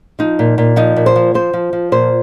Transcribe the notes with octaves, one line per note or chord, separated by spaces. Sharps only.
F3 D#4
A#2
A#2
F3 D#4
A#2
C5
F3
F3 C5
F3
F3
A#2 C5